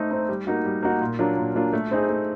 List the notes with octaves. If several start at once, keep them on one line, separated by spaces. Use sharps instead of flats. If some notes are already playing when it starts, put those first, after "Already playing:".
Already playing: A3 C4 D#4
C4 D#4
G3
A#3 D#4 F#4
G3
A#3 D#4 F#4
A#2
F#3 A#3 D4 F4
A#2
F#3 A#3 D4 F4
A3
C4 D#4 G#4
A3